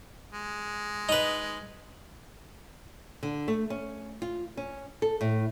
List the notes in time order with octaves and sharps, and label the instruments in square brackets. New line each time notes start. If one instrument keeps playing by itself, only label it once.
[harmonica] G#3
[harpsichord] D#4 B4
[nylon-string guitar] D3
A3
C#4
F4
C#4
A4
A2